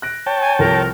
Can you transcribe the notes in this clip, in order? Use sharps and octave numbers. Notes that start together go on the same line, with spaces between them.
F#6 A#6 D7
C#5 G5 A5
G#5
C2 F3 A4 A#4